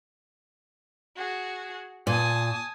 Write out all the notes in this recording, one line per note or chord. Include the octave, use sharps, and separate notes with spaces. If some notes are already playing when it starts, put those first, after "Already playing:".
F#4 G#4
A#2 G#5 A5 D#6